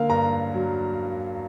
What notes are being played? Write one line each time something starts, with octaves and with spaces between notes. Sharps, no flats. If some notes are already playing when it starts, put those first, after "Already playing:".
Already playing: D3 A#3 F5
G2 A#5
F#3